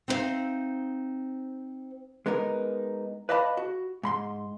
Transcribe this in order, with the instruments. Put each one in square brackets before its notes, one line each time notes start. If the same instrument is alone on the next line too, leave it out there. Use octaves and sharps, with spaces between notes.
[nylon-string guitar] C4 D#4 E4 C5 E5 F5
[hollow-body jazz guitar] G#3 B3 D#4 A#4
B4 D5 D#5 F5 A5 B5
F#4
G#2 B5 C6